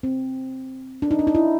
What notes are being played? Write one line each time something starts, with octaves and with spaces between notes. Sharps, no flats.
C4
D4
D#4
D4
D#4
E4